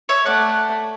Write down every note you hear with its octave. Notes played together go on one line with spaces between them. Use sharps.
C#5 E5
A3 D5 F#5